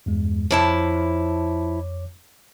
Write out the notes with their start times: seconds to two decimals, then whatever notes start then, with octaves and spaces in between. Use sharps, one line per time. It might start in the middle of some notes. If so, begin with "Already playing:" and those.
0.06 E2 G2 G#3
0.51 F2 F3 E4 C#5 A5 D6